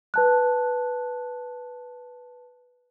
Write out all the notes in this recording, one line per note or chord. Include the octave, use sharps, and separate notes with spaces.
B4 A5 F#6